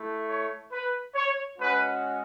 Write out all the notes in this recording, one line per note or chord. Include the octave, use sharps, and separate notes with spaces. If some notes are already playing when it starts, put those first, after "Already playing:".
Already playing: A3 E4
C#5
B4
C#5
G#3 C#4 F#4 B4